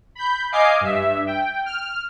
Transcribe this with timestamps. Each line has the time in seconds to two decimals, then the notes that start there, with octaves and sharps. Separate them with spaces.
0.15 B5 G6
0.52 D#5 F5 G#5 D6 C7
0.81 G2 E5
1.27 G5
1.66 F6